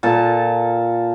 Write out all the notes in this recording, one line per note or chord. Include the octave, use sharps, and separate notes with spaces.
A#2 A4 A5